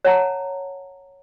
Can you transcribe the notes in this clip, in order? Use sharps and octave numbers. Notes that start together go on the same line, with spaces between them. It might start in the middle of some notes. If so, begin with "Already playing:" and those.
C#5 F#5 A5 A#5